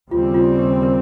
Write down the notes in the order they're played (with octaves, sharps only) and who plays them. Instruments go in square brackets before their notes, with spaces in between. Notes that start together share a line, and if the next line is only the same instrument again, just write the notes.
[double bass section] D#2 C#3 G3 C4 [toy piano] F4
[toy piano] F4
G4
A#4